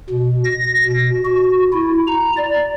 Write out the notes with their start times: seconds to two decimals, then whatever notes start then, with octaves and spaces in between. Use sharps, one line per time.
0.10 B2
0.44 A#6
0.86 B2
1.25 F#4
1.72 E4
2.08 A#5
2.37 D5